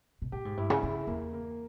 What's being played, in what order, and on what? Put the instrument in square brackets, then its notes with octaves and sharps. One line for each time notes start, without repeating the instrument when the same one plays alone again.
[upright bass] B2
[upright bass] A#2 [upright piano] G4
[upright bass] G#2
[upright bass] G2 [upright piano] E4
[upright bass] C#3
[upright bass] C#3 [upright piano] E4
[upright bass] E2 [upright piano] A#3
[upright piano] A#3